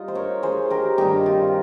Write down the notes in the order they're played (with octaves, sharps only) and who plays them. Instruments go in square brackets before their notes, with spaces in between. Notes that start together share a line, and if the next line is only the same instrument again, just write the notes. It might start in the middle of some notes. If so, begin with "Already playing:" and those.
Already playing: [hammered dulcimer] G3 D#4 F4 D#5
C5
A#4 C#5
G#4 C5
G4 A#4
G2 D#3 G3 C4 D#4 G4
F4